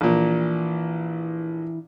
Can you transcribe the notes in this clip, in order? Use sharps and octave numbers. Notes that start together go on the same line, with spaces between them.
A#1 A#2 E3